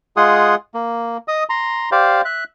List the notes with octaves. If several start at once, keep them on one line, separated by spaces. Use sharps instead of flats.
G#3 F4 G#4 F#5 C6 D#6
A#3
D#5 D#6
A#5 C6
G4 C5 D5 F5
E5 F#6